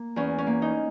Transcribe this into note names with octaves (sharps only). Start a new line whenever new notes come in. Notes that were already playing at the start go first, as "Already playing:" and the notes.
Already playing: A#3
E2 C#4
C#4
A#3
D#4